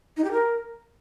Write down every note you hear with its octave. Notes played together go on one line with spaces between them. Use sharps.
D#4
G4
A#4